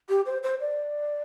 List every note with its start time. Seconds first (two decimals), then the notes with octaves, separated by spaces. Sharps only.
0.09 G4
0.26 C5
0.43 C5
0.61 D5